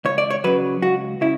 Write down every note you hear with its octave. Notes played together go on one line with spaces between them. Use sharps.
C#2 C#5
D5
C#5
C#3 F#3 B4
C#2 F#4
C#3 E4